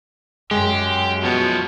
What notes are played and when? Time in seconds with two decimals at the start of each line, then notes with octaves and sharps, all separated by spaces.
0.51 F#2 G#3 G4
1.24 B2 F3 C#5